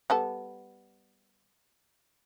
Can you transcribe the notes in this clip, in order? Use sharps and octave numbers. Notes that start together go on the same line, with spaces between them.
G3 B3 A4